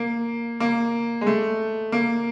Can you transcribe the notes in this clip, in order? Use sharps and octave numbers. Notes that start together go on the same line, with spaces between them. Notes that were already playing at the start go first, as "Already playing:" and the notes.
Already playing: A#3
A#3
G#3
A3
A#3